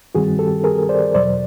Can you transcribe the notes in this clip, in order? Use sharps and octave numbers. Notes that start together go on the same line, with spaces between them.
G2 D#3 G3 C4 F#4 G#4
G4 A4
G#4 A#4
C5 D5
E2 B2 F#3 C5 D5